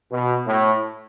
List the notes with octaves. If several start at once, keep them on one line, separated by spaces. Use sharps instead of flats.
B2
A2